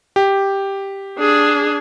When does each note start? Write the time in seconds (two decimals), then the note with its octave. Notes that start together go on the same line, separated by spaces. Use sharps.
0.16 G4
1.19 D4 G#4